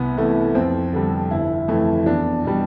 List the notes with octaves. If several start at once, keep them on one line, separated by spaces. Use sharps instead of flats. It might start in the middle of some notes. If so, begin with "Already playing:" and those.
Already playing: C2 B3
C3 E3 A3
F2 C4
D3 G3
G1 E4
F2 E3 A3
E2 D4
B2 G3